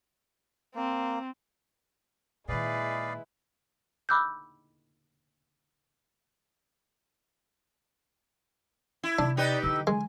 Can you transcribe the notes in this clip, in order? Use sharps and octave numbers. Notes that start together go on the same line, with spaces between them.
A#3 C4
A#2 D#3 G#3 E4 G#4 B4 D5 F5
B5 D6 E6 F#6 G6
E4
C3 D4
D#4 G4 B4 D5
D3 E3 E6
G#3 G#5